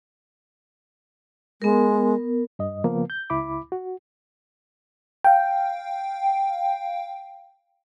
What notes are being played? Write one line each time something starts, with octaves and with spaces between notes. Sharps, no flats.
G#3 B3 A#4
G2 D#5
C#3 F3 A#3 B3
G6
C#2 E4 B5 D6
F#4
F5 G5